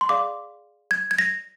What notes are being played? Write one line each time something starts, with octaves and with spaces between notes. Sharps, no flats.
C6
G#4 D5 F5 D6
G#6
G#6
A#6